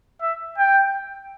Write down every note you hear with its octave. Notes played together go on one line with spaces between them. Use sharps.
E5
G5